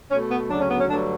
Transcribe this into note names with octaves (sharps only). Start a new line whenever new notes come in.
B2 A3 C#4
B3
D2 C#3 F#3 D4
C#4
B3
C#4
G2 D3 F#3 A3 D4